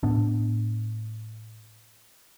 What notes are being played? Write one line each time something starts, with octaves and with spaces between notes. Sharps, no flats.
A2 B3 D4